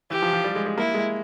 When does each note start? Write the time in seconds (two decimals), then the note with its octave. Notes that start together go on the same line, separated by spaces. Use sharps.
0.10 E3 G4
0.22 F3
0.33 F3
0.44 G3
0.55 G#3
0.66 G#3
0.78 A#3 E4
0.94 G#3